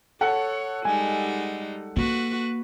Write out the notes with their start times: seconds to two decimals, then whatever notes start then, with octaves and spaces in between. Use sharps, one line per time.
0.21 A4 C#5 F#5
0.85 G3 G#3 D#4 G#5
1.96 A#3 F#4 B4